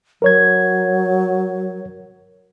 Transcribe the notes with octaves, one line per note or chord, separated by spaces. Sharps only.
F#3 A#4 C#5 G#6